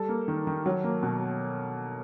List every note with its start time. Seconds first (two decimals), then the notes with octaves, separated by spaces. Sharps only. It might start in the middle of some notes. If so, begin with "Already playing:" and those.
Already playing: G3 A4
0.09 A#3
0.28 D#3
0.47 D#3
0.66 F#3
0.84 A#3
1.03 B2